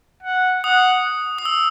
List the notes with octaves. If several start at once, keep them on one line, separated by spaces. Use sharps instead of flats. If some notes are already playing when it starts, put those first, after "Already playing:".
F#5
F#5 D#6
D#6
E6